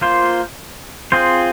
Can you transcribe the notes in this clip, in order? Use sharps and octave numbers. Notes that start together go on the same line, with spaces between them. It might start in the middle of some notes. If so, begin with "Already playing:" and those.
A#3 F4 C5
C4 F4 G#4 C5